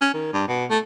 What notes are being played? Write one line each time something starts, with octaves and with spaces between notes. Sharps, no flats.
C#4
D#3
G2
B2
A3